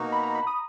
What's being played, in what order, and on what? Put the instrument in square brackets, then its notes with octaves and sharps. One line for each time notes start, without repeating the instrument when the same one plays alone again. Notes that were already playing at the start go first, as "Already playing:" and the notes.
Already playing: [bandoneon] B2 A#3 D#4 F#4 [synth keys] A#5
[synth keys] B5
A#5
B5
D#6